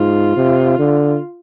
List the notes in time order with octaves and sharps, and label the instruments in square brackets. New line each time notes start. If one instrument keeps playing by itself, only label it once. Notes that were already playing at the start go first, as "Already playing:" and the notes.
Already playing: [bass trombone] G#2 [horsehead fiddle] F4
[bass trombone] C3
D3